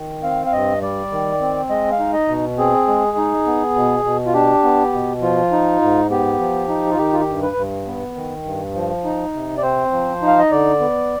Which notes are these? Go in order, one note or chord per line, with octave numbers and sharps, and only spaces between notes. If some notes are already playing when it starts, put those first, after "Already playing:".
Already playing: D#3
C4 F5
F5
G2 D#5
G3 D5
D#3
C4
G#3 D#5
F5
D#4
D#5
B2
C4 G#4
G#3
D#4
B3
B2
B2
F4
D4 G4
B3
B2
F3 F4
D#4
G#2
B3 G4
F3
D#4
F4
D#3 G4
F4
G4
G2
B4
G2
B3
D#3
G2
F3
D#4
C3
D5
C4 C5
F3
D#4
F5
D#5
D3 D5
B3